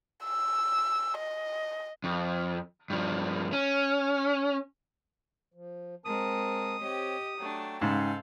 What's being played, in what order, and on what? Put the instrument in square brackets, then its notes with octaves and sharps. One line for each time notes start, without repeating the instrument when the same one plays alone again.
[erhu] E6
D#5
[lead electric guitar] F2
G2 F3
C#4
[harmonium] F3
[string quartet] G#3 [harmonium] C4 A#4 A5 [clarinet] D#6
[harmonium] C4 C#5 [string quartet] G4 D#5
[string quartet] F#3 A3 D4 [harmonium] G5
[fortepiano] G#2 C#3 [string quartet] A4 F5 G6